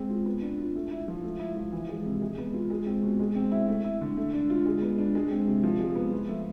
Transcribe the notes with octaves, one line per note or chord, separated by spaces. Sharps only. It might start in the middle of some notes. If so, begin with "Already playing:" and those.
Already playing: G#3 C4
F4
B3
D4
F4
A3
E4
F3
A3
E4
F3
E3
G#3
C3
G#3
B3
F4
G#3
C4
B2
G#3
C4
E4
A3
E4
D3
A3
D4
F4
G#3
B3
D4
G#3
C4
C3
F3
G#3
B3
F3
A3